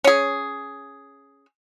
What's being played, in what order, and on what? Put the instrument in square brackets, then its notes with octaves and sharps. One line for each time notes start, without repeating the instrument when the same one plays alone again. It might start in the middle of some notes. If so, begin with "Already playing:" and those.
[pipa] C#4 G#4